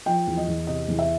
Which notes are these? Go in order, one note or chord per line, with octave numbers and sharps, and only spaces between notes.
F3 G5
E2
D#5
E2
C3 D#5
E2
E5